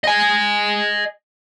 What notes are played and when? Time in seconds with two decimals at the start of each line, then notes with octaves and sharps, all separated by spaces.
0.04 D#5 G#5